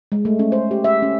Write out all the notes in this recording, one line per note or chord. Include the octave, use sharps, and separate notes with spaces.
G#3
A3
C#4
C5
G4
E5
C#4